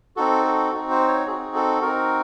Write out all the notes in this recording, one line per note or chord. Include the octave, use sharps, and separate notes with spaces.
C4 D#4 F#4 A4
A4
C4 D#4 F#4
C5
C#5
C4 D#4 F#4 G#4
A4
C4 D#4 F#4 A#4